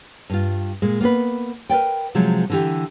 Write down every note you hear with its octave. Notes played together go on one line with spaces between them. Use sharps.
G2 F4
A#2 G#3
A#3 B3 G#4 B4
A#4 B4 D5 G5
C3 F3 F#3 G#3
D3 E3 G4